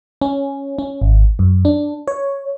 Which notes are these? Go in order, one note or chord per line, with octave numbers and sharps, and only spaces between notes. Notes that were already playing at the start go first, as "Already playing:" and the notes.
C#4
C#4
G#1
F#2
D4
C#5